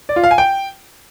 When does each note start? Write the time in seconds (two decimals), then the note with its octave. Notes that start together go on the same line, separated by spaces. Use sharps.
0.09 D5
0.16 F4
0.24 F5
0.31 G#5
0.38 G5